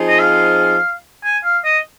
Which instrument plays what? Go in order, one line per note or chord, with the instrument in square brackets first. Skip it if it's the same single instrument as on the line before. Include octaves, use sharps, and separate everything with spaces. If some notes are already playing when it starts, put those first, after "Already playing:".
Already playing: [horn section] F3 C4 D#4 G#4
[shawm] D#5
F5
G#5
F5
D#5